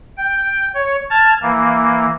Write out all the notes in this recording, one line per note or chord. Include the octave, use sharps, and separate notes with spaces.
G5
C#5
A5 F6 G#6 A6
E3 A#3